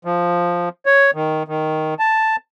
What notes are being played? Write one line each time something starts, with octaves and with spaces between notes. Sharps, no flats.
F3
C#5
D#3
D#3
A5